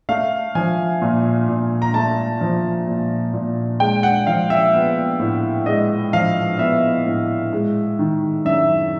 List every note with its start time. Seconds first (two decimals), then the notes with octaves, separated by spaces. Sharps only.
0.09 A3 F5
0.55 F3 G#5
1.02 A#2
1.48 A#2
1.82 A#5
1.94 A3 A5
2.41 F3
2.88 A#2
3.33 A#2
3.80 G#3 G5
4.03 F#5
4.27 F3 F5
4.50 E5
4.74 B3
5.19 A2
5.66 G#3 D#5
6.13 F3 F5
6.59 B3 E5
7.06 A2
7.53 G#3
7.99 D#3
8.45 F#2 E5